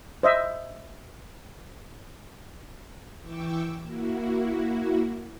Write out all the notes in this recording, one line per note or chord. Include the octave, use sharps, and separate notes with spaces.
C5 D#5 E5
E3 G5 C#6 D6 E6
A#3 E4 F#4